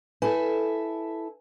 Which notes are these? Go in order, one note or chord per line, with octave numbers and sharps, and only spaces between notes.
E4 A4 B4 G#5